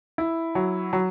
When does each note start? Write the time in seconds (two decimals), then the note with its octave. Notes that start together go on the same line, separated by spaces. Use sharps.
0.18 E4
0.55 F#3
0.93 F#3